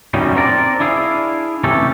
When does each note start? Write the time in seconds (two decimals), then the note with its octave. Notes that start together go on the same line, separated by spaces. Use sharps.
0.14 F#2 A#2 D#3 G3 C#4 D#4
0.36 C4 D4 A#4 D5
0.80 D4 E4 G#4 F5
1.64 C3 E3 A3 C#4 G4 A4